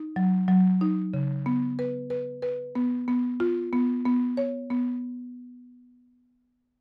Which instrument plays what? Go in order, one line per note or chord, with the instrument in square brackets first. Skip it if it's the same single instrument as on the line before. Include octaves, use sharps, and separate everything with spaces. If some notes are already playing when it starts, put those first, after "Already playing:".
Already playing: [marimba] D#4
F#3
F#3
D#4
C#3
B3
B4
B4
B4
B3
B3
F4
B3
B3
C#5
B3